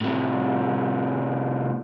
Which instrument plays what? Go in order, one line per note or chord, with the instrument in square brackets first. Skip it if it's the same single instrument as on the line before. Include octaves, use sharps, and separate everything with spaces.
[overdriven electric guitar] A2 C3